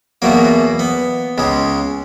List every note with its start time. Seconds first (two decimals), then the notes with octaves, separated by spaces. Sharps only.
0.22 E2 B2 F#3 A#3
0.79 B3
1.38 C#2 C#3 G#3